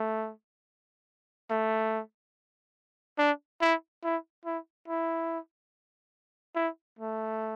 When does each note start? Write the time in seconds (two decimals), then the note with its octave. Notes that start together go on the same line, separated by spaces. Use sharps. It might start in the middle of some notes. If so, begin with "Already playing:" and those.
Already playing: A3
1.50 A3
3.18 D4
3.61 E4
4.04 E4
4.45 E4
4.88 E4
6.56 E4
6.99 A3